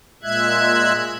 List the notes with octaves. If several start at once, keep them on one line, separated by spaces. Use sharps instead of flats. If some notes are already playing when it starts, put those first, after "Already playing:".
A#2 G#3 E5 F#6 G#6